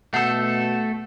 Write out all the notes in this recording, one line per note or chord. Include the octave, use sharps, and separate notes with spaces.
B2 A3 A4 F#5 E6 G6 C7